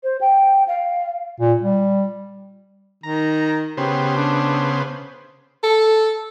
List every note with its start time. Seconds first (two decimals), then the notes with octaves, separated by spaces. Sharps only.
0.03 C5
0.21 G5
0.68 F5
1.40 A#2
1.61 G3
3.03 D#3 A#5
3.77 C#3 B3 G4 C5
4.16 D4
5.63 A4